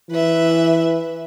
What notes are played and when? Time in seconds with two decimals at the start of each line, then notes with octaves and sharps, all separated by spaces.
0.11 E3 B4 E5